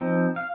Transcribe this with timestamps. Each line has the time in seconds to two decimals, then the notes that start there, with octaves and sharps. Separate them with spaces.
0.01 F3 C4 D#4
0.36 F5